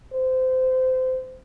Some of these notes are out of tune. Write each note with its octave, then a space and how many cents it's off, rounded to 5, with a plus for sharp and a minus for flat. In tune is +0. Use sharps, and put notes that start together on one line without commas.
C5 -25